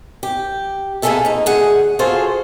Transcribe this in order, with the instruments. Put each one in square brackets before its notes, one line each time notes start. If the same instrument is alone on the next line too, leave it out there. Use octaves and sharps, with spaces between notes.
[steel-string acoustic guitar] G4
A#3 B3 F4 G#4 A4 E5
F2 D#4
D2 G#4 F#5
F4 F#4 G#4 A4 C5